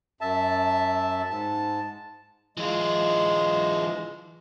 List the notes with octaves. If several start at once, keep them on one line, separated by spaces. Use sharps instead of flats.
F#2 E5 A5
G#2 A5
E3 G#3 F4